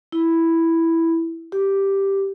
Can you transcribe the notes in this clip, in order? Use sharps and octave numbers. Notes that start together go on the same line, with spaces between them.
E4
G4